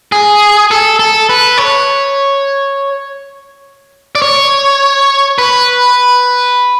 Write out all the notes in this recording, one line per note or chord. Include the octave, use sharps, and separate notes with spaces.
G#4
A4
A4
B4
C#5
D5
C#5
B4